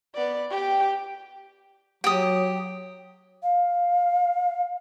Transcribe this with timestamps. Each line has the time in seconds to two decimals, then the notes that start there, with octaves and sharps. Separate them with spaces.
0.15 B3 D5
0.51 G4 G5
2.04 F#3 G4 D#6
3.43 F5